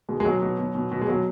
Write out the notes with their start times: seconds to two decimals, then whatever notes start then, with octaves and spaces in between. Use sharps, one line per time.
0.09 B2 G#3
0.20 G#3
0.25 B2 F#3
0.42 B2
0.59 B2
0.75 B2
0.92 B2
1.01 G#3
1.08 B2 F#3